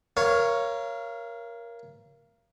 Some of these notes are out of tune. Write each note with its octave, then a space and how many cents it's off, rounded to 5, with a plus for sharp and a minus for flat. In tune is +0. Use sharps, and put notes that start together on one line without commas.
A#4 +10 C#5 +0 F5 -30